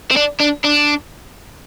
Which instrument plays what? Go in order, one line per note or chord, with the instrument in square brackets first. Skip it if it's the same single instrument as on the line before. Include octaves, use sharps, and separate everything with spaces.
[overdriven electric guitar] C4
D4
D4
D4